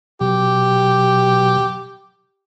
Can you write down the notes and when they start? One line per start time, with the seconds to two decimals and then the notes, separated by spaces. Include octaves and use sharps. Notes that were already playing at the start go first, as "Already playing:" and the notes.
0.20 B2 F#3 G4